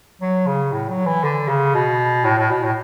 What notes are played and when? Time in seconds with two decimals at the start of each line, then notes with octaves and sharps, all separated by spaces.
0.21 F#3
0.47 C#3
0.72 A2
0.89 F#3
1.06 E3
1.23 D3
1.48 C#3
1.74 B2
2.25 A2
2.38 A2
2.50 B2
2.63 A2